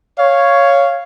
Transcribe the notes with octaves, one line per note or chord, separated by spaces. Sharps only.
C#5 F5